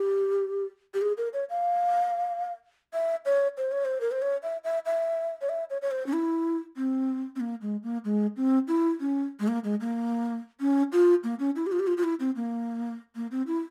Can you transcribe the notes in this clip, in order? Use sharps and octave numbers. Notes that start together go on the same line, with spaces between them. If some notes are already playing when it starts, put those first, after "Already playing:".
Already playing: G4
G4
G#4
A#4
C#5
F5
E5
C#5
C5
C#5
C5
A#4
C5
C#5
E5
E5
E5
C#5
E5
C#5
C#5
C5
C#4
E4
C4
C4
A#3
G#3
A#3
G#3
C4
E4
C#4
G#3
A#3
G#3
A#3
C#4
F4
A#3
C#4
E4
G4
F4
G4
F4
F4
E4
C4
A#3
A#3
C4
E4